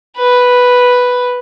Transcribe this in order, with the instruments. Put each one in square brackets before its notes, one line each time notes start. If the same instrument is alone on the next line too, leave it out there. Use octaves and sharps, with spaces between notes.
[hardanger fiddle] B4